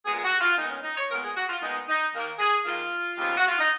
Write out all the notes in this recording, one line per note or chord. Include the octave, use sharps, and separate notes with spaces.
A#2 G#3 B3 G#4
G#4
F#4
F4
A#2 G#3 B3 D#4
C#4
D#4
C#5
A#2 G#3 B3 A#4
G#4
F#4
F4
A#2 G#3 B3 D#4
D#4
D#2 D#3 A#3
G#4
D#2 D#3 A#3 F4
D#2 C#3 F3 B3
F#4
F4
D#4